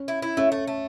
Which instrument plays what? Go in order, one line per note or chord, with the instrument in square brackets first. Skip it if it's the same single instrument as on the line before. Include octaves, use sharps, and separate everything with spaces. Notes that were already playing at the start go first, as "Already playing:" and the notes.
Already playing: [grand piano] C#4
[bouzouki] E4
E4
[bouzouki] A3 [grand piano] C#4
[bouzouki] A3
A3